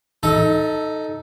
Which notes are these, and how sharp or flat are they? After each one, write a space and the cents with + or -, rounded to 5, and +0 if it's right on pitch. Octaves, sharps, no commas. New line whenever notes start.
D#4 +0 A4 +0 E5 -40